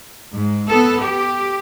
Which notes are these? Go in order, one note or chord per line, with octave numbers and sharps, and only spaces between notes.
G#2
B3 A4
G4